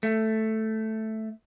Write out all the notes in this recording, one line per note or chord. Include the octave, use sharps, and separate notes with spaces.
A3